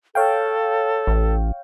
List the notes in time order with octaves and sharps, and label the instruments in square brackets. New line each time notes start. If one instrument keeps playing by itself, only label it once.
[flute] A4 [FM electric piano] C#5 F5 G5
[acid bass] A1